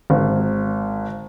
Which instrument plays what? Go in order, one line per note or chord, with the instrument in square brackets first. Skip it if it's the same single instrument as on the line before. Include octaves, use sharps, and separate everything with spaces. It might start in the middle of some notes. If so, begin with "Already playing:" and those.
[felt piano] G#1